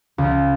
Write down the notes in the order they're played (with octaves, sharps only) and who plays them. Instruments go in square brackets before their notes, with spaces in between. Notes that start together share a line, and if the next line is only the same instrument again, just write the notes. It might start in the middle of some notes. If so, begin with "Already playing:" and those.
[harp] C#2